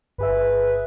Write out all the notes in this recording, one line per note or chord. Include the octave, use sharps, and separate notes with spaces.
G1 G#4 B4 E5